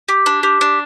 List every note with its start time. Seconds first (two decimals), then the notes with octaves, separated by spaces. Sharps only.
0.08 G4
0.26 D4
0.43 G4
0.61 D4